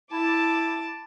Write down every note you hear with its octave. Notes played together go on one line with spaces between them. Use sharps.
E4 A5 D6